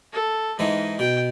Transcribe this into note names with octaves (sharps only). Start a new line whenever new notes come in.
A4
G#2 E3 G#3 D#4
B2 G5